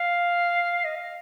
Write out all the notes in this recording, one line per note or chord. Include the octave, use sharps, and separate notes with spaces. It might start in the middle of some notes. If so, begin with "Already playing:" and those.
Already playing: F5
D#5
F5